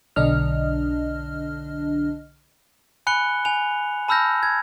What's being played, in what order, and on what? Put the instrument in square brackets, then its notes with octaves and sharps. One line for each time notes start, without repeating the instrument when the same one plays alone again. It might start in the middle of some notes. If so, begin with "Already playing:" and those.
[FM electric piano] B1 D3 D4 D#5 F6
[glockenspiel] G#5 B5 F#6 C#7 G7
G#5 F7
A5 B5 E6 F6 G6 A#6
G#6